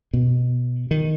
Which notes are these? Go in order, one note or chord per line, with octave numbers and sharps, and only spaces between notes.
B2
D#3